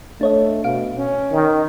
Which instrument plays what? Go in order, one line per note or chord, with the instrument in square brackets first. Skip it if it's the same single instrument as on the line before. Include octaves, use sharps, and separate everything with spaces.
[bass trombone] A3 [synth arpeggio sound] D4 C#5 D#5
[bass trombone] B2 [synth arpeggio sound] F5 D7
[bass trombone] C#4
[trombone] D#3